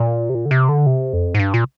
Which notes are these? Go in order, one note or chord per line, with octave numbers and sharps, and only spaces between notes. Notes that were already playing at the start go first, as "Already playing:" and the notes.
Already playing: A#2
C3
A#2
D3
C3
D3
C3
F2
G#2
G2
A#2